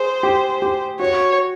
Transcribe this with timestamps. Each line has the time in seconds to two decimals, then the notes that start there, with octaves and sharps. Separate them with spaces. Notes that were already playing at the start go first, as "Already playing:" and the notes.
Already playing: G#4 C5
0.23 G4
0.62 G4
1.00 F#4 C#5